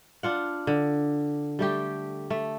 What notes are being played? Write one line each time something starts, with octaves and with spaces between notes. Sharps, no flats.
D4 F4 F#5
D3
G3 A3 G4
A3